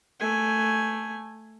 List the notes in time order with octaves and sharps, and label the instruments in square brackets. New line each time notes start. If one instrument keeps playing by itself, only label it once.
[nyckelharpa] A3 G#5